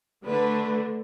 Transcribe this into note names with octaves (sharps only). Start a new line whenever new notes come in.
D3 A3 D4 B4